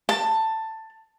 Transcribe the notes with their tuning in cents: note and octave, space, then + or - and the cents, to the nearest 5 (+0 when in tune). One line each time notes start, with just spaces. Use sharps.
A5 +10